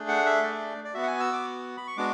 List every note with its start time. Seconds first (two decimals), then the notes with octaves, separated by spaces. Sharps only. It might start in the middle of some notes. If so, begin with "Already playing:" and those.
Already playing: A3 D4 G#4
0.08 F#5
0.26 E5
0.43 D5
0.84 D5
0.94 B3 F#4 E5
1.03 F#5
1.07 G#5
1.20 E6
1.33 D6
1.77 B5
1.87 C#6
1.97 G#3 B3 D4 F#4 D6